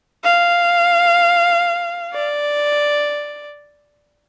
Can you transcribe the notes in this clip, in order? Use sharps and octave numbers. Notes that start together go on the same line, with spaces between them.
F5
D5